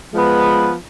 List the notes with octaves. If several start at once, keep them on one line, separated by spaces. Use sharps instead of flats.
F3 G#3 B3